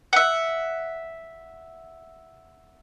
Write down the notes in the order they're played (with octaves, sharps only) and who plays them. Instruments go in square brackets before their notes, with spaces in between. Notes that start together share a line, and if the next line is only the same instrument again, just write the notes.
[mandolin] E5 F#5